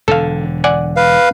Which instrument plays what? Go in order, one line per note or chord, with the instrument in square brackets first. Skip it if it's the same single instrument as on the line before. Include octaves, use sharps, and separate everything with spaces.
[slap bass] E1 D3 [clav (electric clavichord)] A4 F5
[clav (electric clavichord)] D5 F#5 G#5
[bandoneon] B4 F5